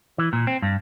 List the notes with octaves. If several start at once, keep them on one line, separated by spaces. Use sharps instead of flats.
E3
A#2
C4
G2